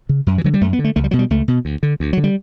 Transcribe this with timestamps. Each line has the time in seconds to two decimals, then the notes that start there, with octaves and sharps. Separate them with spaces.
0.09 C#3
0.27 F#2
0.38 E3
0.44 D3 F#3
0.54 G3
0.61 F#2 A3
0.73 B3
0.79 D3
0.84 A3
0.96 C#2 A3
1.04 G3
1.11 B2 F#3
1.19 G3
1.30 C#2 A3
1.48 B2
1.65 D2
1.83 D3
2.00 D2
2.13 D3 F#3
2.24 G3